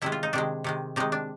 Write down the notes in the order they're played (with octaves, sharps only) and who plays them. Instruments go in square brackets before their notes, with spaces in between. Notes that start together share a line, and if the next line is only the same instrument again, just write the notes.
[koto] C3 D#3 G#3 E4
F4
D#4
C3 D#3 G#3 D4
C3 D#3 G#3
C3 D#3 G#3 D#4
D4